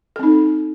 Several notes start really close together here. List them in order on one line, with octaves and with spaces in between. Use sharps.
A4 C4 D#4